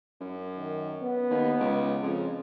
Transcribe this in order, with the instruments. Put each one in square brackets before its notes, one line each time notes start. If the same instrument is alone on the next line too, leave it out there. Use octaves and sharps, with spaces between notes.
[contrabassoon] F#2
[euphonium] D#3
B3
[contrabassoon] D#2
C#2
[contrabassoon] F2 [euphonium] C#3